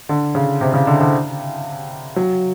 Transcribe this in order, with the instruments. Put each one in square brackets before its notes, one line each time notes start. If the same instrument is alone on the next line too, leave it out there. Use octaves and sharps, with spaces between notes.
[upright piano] D3
C#3
C3
C#3
D3
D3
F#3